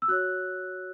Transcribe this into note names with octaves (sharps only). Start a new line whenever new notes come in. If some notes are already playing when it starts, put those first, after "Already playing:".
E6
F#4 C#5 F#6